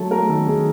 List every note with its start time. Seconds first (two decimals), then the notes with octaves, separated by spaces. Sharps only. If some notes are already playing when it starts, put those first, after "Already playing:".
Already playing: F#3 A3 A4
0.11 A3 A#4
0.29 D#3 A4
0.47 D#3 G#4